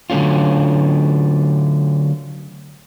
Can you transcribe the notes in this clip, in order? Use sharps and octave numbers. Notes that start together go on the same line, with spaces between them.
D3 F#3 A3 C#4 F4